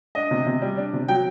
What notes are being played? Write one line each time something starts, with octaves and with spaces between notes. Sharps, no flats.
D4 D#5
C3
C3
G3
D4
C3
F#3 G5